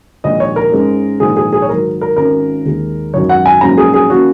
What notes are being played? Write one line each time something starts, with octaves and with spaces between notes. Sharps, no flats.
A#1 G#2 D#3 D#5
C#5
A#4
G#2 G#3 C#4
A#1 G#2 D#3 G#4
G#4
G#4
C#5
G#2 D#3 F#3 A#4
A#4
G#1 G#2 G#3 C#4 A#4
D#2 D#3 G#3
G#1 F#2 D#3 F#3 C#5
F#5
G#5
A#1 G#2 F#3 A#3 C#4 A#5
G#4
G#4
D#3 A#3 C#4 F#4